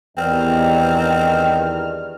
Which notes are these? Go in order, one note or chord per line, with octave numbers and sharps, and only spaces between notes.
E2 G2 D#3 G3 C4 F6